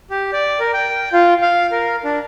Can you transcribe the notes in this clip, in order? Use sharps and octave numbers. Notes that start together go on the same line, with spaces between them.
G4
D5
A#4
G5
F4
F5
A#4
D4